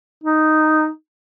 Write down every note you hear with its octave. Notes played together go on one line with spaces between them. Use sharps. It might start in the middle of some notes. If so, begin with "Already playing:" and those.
D#4